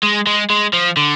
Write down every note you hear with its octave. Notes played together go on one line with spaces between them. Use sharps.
G#3
G#3
G#3
F3
D3